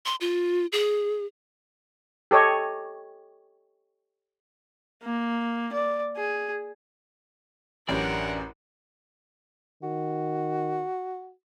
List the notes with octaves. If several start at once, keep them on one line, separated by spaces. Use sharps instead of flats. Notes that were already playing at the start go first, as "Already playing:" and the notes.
C6
F4
G#4
G4 A4 C#5 D#5
A#3
D5
G#4
A1 F#2 C#4 D4 G4 A#4 D5 F#5
D#3 F#4